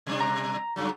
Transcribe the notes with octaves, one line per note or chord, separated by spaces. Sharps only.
B2 G3 D4
A#5
F#2 C#3 F#3